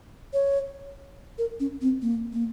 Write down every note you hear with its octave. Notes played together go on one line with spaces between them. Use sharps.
C#5
A#4
C#4
C4
A#3
A#3